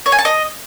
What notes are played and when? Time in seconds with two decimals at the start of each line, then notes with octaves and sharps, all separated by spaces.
0.06 C#5
0.12 G#5
0.19 A5
0.25 D#5